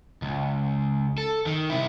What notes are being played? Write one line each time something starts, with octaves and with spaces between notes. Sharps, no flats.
C#2
A4
D#3
C3 E4